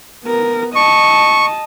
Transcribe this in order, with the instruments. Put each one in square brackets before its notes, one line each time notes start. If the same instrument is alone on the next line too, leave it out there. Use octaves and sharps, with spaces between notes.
[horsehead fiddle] B3 A#4
[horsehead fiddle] D#5 A5 [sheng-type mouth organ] C#6